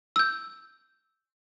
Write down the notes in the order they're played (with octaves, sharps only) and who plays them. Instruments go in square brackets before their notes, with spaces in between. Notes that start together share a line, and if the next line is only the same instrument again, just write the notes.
[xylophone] E6 G6